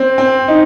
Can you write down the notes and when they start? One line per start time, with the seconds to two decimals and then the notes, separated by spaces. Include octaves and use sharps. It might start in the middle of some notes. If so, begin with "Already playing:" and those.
Already playing: C4
0.18 C4
0.48 D#4